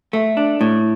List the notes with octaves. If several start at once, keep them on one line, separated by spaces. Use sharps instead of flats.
A3
D4
A2